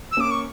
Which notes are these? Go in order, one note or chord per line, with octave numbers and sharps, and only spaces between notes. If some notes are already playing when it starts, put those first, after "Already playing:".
E6
A#3 C#4 D6
C#6